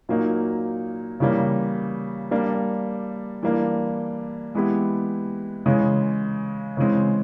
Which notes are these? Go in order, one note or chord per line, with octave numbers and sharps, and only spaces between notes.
A#2 F#3 A#3 D#4
C#3 E3 G3 A#3
G3 A#3 D4
E3 G3 A#3 D4
E3 G#3 B3 E4 G4
C#3 E3 G#3
C#3 E3 G#3 C4